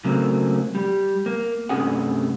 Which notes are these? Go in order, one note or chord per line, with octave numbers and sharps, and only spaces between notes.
C#3 F#3 A3 A#3 C4
G3
A#3
G2 C3 A3 C#4 G#4 F#5